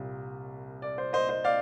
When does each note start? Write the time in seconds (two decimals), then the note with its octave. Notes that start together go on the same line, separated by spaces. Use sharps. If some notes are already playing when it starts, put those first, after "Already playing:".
Already playing: C2 A#2 G3
0.82 D5
0.98 C5
1.13 C5 D#5
1.29 C5 D#5
1.44 D5 F5